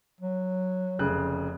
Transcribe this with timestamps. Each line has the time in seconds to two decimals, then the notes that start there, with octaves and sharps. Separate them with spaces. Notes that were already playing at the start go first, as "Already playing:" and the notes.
0.20 F#3
0.99 F1 C#3 F#6